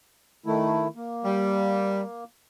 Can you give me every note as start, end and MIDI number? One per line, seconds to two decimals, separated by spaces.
0.46 0.88 51
0.46 0.88 57
0.46 0.88 64
0.96 2.24 58
1.25 2.02 55